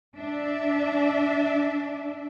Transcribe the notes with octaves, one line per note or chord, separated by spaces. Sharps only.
D4 E5